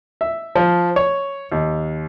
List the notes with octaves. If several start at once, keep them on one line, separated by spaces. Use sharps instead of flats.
E5
F3
C#5
D#2